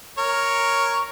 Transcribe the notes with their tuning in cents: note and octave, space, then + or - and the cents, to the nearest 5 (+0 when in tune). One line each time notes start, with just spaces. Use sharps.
A#4 +0 C#5 +0